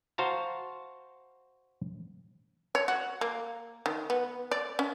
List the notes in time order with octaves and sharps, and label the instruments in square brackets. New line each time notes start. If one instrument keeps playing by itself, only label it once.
[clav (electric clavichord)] F#4 C5 F5 A5 A#5
[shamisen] C#5
F#4
A#3
D#3
B3
D5
C#4